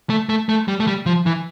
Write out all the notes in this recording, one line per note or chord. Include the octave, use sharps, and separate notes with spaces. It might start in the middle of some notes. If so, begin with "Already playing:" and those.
A3
A3
A3
G3
A3
G3
F3
E3